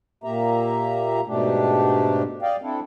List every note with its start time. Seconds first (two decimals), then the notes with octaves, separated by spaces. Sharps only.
0.24 A#2 A#3 G4 E5 A#5
1.27 G#2 B2 A3 D4 G4
2.42 D5 D#5 F5 G5
2.62 C4 D4 E4 A4